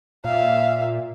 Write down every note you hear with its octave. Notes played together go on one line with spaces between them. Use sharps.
A#2 E5 F5